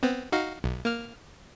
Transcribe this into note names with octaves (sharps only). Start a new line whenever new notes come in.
B3 C4
D#4 F#4 F5
B1
A#3 F6